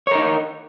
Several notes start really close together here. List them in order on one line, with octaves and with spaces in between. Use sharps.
C#5 A#4 D#4